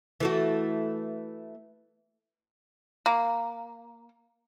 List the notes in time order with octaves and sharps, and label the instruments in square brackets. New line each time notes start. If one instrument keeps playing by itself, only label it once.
[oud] E3 A3 F#4
[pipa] A#3